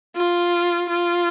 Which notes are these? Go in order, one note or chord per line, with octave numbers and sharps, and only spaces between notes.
F4
F4